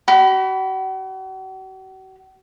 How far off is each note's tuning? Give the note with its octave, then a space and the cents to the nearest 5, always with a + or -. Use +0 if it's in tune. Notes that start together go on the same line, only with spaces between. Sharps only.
F#4 +40 B5 +0